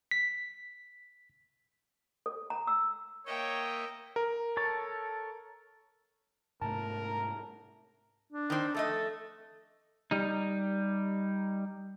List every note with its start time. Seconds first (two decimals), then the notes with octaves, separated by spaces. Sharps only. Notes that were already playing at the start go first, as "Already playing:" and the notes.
0.11 B6
2.26 A4
2.50 A#5
2.67 E6
3.27 A#3 C#5 D#5 E5 G5
4.16 A#4
4.57 A4 C#5 A5
6.62 G#2 C3 A3 A#4 A5
8.32 D4
8.50 D#3 C4
8.74 F2 A3 A4 D#5
10.11 G3 D#4